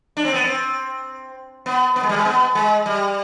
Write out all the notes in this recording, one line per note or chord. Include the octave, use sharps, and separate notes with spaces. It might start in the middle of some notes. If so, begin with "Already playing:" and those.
D4
C4
B3
C4
B3
B3
G#3
G3
G#3
B3
G#3
G3